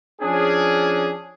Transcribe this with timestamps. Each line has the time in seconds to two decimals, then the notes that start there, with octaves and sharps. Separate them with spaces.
0.21 F3 C#4 D4 G#4